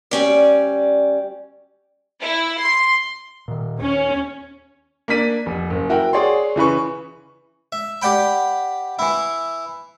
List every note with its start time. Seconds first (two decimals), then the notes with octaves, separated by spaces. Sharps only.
0.11 D2 G3 C#4 D5
2.22 E4
2.61 C6
3.48 A#2 D#3
3.81 D#2 C#4
5.08 A#3 D4 D5 B6 D#7
5.46 F1
5.70 F#1
5.89 E4 F#4 A#4 G5
6.13 G#4 C#5 D5 C6
6.56 C#3 E3 B4 C#6
7.72 E5
8.02 G4 D5 F#5 G5 B5
8.99 E3 E4